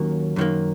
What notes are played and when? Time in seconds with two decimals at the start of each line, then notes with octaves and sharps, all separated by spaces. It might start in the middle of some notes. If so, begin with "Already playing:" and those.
Already playing: D#2 D#3 F#3 A#3 C#4
0.36 F#2 D#3 F#3 A#3